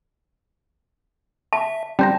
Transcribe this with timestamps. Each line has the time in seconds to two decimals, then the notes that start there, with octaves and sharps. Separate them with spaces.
1.53 E5 A5
1.99 G3 C#4 C5 A5 A#5